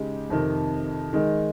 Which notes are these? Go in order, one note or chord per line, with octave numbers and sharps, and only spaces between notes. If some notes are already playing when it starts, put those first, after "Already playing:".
Already playing: C#3 G#3 D#4 G4
F2 C3 D#3
D#3 G#3 D#4